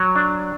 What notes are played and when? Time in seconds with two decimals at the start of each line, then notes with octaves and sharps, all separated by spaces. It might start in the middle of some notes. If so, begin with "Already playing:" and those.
Already playing: F#3
0.16 D4